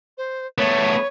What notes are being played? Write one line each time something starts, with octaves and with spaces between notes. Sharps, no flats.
C5
A3 B3 C#5